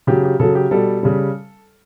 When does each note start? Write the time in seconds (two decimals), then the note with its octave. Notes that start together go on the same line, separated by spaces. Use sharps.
0.07 C#3 F#3 G4
0.23 G4
0.40 C#3 F#3 A4
0.55 G4
0.71 B2 G3 A4
1.03 C#3 G3